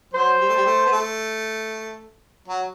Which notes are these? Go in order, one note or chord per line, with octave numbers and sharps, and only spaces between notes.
F#3 C5
G3
A3
G3
A3
B3
A3
F#3